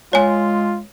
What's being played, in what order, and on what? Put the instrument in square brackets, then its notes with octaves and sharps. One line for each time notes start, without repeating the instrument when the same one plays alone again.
[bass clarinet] G#3 [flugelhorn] F4 [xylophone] C#5 G#5